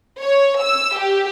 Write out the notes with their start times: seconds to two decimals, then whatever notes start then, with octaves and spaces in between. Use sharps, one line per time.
0.21 C#5
0.62 E6
0.99 G4